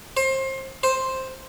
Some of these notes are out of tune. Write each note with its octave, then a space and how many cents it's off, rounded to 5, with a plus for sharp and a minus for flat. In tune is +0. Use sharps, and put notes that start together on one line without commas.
C5 +30
C5 +5